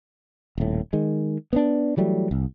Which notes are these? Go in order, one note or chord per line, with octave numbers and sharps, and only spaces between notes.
D#1 A2
D#3 G#3
B3 C4 D4
E3 F#3 G3 A3
C2